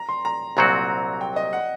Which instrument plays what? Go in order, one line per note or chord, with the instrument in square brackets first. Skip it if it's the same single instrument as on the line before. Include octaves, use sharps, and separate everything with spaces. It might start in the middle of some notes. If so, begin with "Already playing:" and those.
Already playing: [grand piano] A#5
C6
A#5
[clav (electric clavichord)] C2 A#2 F#3 C4 F#4 [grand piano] A#5
[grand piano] G5
D#5
F#5